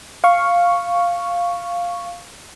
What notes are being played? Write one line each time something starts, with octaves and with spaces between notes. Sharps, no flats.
F5 C#6